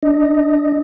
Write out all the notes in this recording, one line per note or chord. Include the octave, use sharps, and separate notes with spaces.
D4 D#5